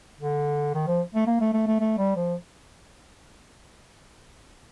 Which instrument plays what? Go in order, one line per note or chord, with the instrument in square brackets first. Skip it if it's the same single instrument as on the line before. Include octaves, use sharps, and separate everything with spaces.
[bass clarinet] D3
D#3
F3
A3
A#3
A3
A3
A3
A3
G3
F3